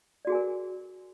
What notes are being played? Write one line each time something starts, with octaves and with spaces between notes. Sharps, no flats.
F#4 G#4 A#4 D5 G#5